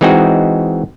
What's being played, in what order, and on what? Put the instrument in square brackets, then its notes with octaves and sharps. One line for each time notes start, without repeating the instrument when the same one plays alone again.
[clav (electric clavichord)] E3 G#3 C4 D#4 F#4